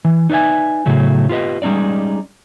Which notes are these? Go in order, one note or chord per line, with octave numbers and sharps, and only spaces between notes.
E3
D#4 B4 D5 E5 G#5
A2 C#3 F#3 A3
F4 G4 B4 D#5
G3 G#3 C#4 D#4 D5